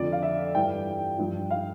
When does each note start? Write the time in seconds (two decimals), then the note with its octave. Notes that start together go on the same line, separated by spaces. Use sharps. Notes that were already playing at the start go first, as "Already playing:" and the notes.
Already playing: F2 D3 F3 D5
0.12 F5
0.23 E5
0.55 G2 E3 G3 G5
1.18 G2 F3
1.51 F5